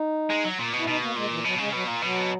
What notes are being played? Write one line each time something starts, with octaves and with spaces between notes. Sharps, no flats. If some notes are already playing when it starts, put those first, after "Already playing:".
Already playing: D#4
G#3
F#3
A#2
B2
E4
B2 D#4
A#3
A#2 G#3
E3
B2 F#3
C#3 G#3
B2 F#3
A#2
B2 F#3